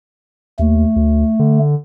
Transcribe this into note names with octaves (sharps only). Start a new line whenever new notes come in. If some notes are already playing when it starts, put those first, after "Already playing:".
D#2 A3
D2
D3